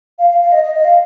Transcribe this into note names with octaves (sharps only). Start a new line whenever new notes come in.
F5
F5
F5
D#5
D#5
D#5
F5